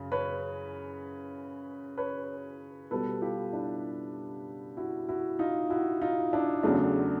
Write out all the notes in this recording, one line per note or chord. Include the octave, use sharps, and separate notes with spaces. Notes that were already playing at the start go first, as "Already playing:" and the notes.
Already playing: F#2 C#3
B4 C#5
B4 C#5
B2 G3 A4 B4
F4 G4
D4 E4
E4 F#4
E4 F#4
D#4 F4
E4 F#4
D#4 F4
D4 E4
E2 C#3 F#3 A3 D4